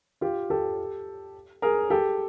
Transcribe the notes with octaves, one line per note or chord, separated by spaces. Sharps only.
F4 G4
G4 A4
G#4 A#4
G4 A4